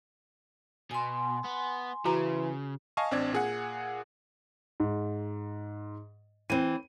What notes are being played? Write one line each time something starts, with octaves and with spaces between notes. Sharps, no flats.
B2 G#5 C6
B3
C#3 E3 F#4 A#5
D#5 F5 G#5 A5 C#6
A1 C4 D4 D5 G#6
A#2 G#4 F#5
G#2
E3 C4 D#7